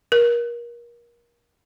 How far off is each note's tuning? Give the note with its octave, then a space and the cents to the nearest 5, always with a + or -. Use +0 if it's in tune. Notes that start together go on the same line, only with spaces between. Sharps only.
A#4 +30